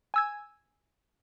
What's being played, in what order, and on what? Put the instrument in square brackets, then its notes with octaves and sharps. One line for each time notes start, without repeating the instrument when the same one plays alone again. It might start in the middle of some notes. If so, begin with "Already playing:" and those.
[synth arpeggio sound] G#5 E6 G#6